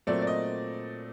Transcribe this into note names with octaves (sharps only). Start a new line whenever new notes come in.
A#2 F#3 A3 C4 D5
D5
D#5